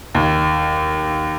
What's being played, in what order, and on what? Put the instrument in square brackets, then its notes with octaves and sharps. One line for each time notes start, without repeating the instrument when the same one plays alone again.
[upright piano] D#2